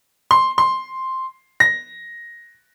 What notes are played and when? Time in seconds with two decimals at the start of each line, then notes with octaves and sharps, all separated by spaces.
0.31 C6
0.58 C6
1.60 A#6